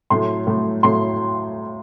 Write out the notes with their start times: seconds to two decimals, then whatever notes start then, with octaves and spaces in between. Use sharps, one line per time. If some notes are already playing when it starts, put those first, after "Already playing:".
0.10 A2 F#3 A3 C6
0.47 A2 F#3 A3
0.83 A2 F#3 A3 C6